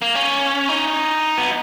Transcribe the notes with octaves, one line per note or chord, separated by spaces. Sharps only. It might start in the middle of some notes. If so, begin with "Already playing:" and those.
A#3
C#4
D#4
B3